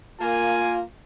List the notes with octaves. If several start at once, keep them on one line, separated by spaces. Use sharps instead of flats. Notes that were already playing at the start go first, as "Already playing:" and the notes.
A#3 F4 G#5